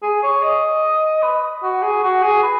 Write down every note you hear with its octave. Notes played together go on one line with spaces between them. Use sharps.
G#4
C#5
D#5
B4
F#4
G#4
F#4
G#4
B4